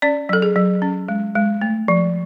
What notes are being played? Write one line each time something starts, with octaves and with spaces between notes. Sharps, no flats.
C#4 D5
F#3 A4
G#4
F#3
C#4
G#3
G#3
A3
F3